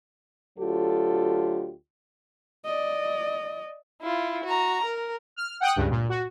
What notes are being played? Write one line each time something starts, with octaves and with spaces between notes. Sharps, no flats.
D2 F#3 F4 G4 A4
D5 D#5
E4 F4
F#4 A#5
A#4
F6
F#5 G5 D#6 F#6
C#2 G2
A#2
F#4